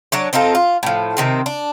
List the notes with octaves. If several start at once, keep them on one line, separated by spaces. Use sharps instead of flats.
F#3 D4 C#5
C4 D#4 F4 A4
F4
A2 F3
C3 D#3 C4
D4